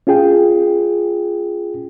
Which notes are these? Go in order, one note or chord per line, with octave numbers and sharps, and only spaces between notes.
C#4 F4 G#4 G5